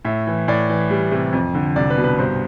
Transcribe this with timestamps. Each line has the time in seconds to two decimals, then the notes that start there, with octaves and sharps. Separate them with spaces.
0.05 A2 E5
0.27 E3
0.48 A2 D5
0.69 E3
0.90 G3
1.11 C3
1.33 F2
1.54 D3
1.76 C2 D5
1.90 B4
1.97 B2
2.04 B4
2.18 G2 C5